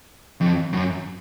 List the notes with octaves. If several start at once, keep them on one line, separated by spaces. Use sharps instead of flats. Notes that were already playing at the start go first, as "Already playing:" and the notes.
F2
F#2